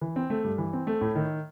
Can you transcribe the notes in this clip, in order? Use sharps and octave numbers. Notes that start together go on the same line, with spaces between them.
E3
C4
A3
G2
E3
C4
A3
A2
D#3